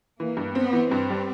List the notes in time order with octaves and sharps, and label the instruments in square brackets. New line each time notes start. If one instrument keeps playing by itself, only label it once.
[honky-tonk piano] E3 [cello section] A#3
[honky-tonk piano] G2
[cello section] B3 [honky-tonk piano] C4
[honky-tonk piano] E3
[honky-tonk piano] G2 [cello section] C4
[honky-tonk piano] G3